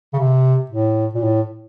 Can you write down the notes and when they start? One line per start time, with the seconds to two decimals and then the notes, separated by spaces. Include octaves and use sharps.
0.14 C#3
0.19 C3
0.70 A2
1.14 A#2
1.23 A2